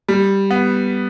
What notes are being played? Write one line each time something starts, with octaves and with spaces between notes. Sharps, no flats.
G3
B3